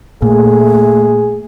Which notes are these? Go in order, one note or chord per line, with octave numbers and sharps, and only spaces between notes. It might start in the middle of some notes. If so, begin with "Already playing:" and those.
A#2 A3 G#4